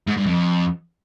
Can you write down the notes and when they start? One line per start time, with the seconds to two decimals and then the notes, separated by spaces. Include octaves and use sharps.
0.07 G#2
0.17 G2
0.26 F2